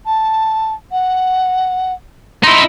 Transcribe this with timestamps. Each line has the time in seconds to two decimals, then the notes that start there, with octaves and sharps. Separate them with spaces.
0.06 A5
0.92 F#5
2.44 D#4 E4 C6